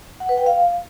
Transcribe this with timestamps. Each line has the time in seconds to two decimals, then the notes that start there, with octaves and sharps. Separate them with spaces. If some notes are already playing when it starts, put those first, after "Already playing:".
0.20 F#5
0.29 B4
0.38 G5
0.46 F5